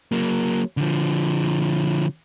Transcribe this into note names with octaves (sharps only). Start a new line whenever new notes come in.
F#3 A#3
D3 F3